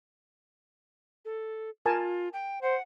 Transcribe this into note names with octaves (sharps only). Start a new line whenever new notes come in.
A4
F4 A#4 G#5 A5
G5
C5 F#5